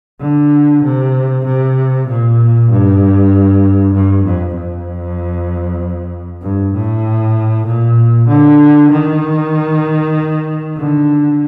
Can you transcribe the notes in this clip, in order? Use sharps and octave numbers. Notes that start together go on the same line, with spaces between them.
D3
C3
C3
A#2
G2
G2
F2
F2
G2
A2
A#2
D3
D#3
D3